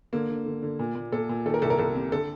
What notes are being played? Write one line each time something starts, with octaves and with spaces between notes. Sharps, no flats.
D3 A#3
D3
D3
D3
A#2
A#2
A#2 A4
A#2
D#3 A4
A#4
C2 A4
A#4
C2 A4
C3
D3 A4